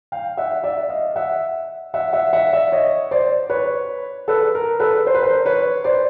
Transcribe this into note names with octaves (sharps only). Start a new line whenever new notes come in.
F5 G5
E5 F#5
D5 E5
D#5 F5
E5 F#5
E5 F#5
E5 F#5
E5 F#5
D5 E5
C#5 D#5
C5 D5
B4 C#5
A4 B4
A#4
A4 B4
C5
B4
A#4 C5
B4 C#5
C5 D5